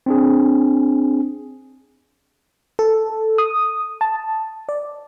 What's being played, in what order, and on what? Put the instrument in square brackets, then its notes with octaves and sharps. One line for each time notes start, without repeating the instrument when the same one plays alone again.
[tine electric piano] C4 D4 G#4
[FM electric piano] A4
D#6
A5
D5